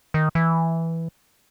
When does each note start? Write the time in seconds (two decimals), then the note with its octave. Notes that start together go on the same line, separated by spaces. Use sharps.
0.14 D#3
0.35 E3